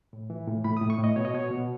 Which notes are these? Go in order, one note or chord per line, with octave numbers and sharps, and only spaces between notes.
A2
E3
A2
A2 B5
D#6
A2
C#6
A2 D#5
B2 C#5
D#5
B2 C#5
B2